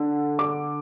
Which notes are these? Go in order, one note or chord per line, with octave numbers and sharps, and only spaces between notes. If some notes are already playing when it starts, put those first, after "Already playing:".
Already playing: D3
D6